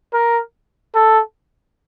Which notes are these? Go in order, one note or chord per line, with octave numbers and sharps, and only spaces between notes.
A#4
A4